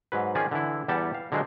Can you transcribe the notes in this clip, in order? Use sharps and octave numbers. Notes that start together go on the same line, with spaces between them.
G#2 F#3 B4
D#3 F3 C#4 F4 G#4 D5
D3 E3 E4
E2 G3 G4 F#5 A5
F5
D3 F#3 G#3 F4 C5